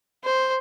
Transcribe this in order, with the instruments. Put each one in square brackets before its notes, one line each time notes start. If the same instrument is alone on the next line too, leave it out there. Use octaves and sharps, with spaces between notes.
[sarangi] C5